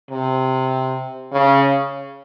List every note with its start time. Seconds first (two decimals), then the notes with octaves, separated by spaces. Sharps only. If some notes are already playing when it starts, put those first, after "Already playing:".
0.10 C3
1.33 C#3